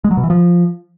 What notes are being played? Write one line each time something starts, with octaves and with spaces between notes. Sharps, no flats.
G#3
F#3
B2
E3
F3